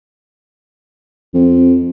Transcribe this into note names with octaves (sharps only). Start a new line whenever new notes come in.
F2